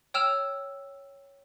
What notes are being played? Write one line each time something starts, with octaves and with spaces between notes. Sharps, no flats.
C#5 G5 E6 F6 E7 F7